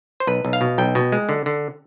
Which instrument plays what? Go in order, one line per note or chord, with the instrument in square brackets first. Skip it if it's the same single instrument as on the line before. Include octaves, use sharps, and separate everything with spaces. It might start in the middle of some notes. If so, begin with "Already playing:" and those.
[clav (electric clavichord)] C5
B1 B4
B1
F5
B2
B1 G5
B2
G#3
D3
D3